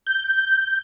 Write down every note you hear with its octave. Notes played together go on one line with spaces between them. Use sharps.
G6